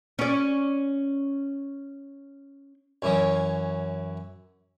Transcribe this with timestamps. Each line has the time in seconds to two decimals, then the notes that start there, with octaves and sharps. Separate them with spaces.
0.19 C#4 D5
3.02 F#2 E3 C#4